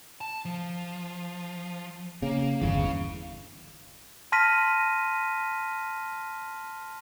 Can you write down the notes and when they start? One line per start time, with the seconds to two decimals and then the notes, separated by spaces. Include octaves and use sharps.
0.21 A5
0.45 F3
2.22 C#3 A#3
2.62 G1 E2 C#4 F5
4.32 A5 C6 F6 A#6 B6 D#7